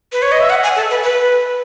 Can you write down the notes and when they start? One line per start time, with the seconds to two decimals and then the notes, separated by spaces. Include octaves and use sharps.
0.13 B4
0.22 C#5
0.32 D#5
0.41 E5
0.50 F#5
0.63 G#5
0.76 A4
0.90 B4
1.03 B4